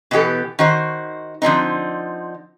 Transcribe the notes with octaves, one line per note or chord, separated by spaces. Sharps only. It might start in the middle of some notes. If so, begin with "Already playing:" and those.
B2 E3 B3 G4 A4
D#3 F#4 C5
D3 F3 C4 D#4